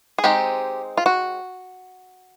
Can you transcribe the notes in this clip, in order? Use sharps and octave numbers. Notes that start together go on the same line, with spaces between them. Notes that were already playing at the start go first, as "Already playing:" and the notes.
G#4
G#3 C4 D#4 G4
F4
F#4